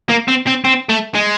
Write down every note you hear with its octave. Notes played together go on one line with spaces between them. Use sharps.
A#3
C4
C4
C4
A3
G#3